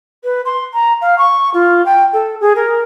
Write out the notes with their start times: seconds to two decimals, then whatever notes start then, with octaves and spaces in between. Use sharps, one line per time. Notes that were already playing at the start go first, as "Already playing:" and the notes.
0.24 B4
0.45 C6
0.73 A#5
1.01 F5
1.18 C#6
1.54 F4
1.85 G5
2.13 A4
2.40 G#4
2.55 A#4